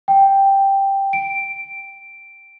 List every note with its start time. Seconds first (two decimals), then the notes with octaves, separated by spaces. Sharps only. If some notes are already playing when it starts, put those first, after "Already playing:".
0.08 G5
1.13 D7